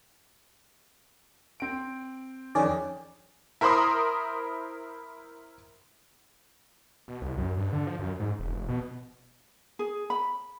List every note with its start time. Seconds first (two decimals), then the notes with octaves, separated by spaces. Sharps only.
1.60 C4 D7
2.55 F2 D#3 C#4 G#4 D5
3.61 E4 A#4 C5 B5 C6 D#6
7.08 B2
7.22 C2
7.38 F#2
7.56 G2
7.73 D3
7.87 F3
7.99 F#2
8.20 G#2
8.39 E1
8.53 F1
8.69 B2
9.79 G#4
10.10 B5